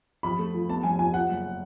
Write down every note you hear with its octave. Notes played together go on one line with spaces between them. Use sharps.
F2 B5
A3
F3
B3 A5
F1 G#5
F3 G#5
F3 F#5
F#1